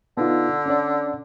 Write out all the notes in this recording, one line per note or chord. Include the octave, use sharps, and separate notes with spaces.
D3 B3 D#4 F4
C#4 D4 D5